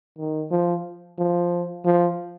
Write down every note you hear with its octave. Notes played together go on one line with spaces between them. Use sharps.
D#3
F3
F3
F3